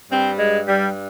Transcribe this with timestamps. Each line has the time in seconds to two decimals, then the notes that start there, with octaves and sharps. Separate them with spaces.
0.10 G2 G3 C4
0.38 G#3
0.67 G3